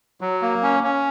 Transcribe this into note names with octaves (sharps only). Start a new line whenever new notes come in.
F#3
A#3
C#4
C#4